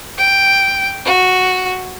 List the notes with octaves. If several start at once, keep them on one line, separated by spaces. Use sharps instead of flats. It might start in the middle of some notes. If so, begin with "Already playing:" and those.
G5
F#4